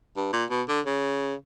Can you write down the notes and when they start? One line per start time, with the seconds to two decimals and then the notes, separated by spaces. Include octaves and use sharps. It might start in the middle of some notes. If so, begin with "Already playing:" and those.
0.16 G2
0.33 A#2
0.50 B2
0.68 D3
0.86 C#3